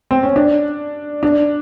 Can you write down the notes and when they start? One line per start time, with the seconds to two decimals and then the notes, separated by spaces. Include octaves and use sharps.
0.11 C4
0.23 C#4
0.36 D4
1.23 D4